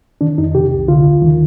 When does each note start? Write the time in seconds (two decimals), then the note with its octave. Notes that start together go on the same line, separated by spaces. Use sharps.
0.21 D#3 D4
0.38 F2 D#4
0.55 C3 G4
0.71 C2
0.88 D3 F4
1.06 D#2
1.22 D#3